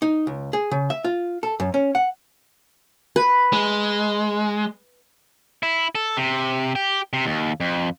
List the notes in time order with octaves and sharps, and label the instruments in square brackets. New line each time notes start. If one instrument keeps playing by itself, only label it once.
[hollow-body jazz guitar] D#4
C#2
G#4
C#3
E5
F4
A4
F#2
C#4
F#5
[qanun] B4
[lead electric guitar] G#3
[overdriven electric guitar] E4
A4
C3
G4
C3
D#2
F2